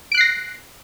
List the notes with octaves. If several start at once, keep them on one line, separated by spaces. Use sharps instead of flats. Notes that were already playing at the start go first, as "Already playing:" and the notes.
F#6 A#6 C7 D7